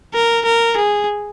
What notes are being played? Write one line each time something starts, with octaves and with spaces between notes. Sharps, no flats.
A#4
A#4
G#4